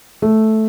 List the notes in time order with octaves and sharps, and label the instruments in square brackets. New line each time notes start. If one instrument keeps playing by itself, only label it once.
[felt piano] A3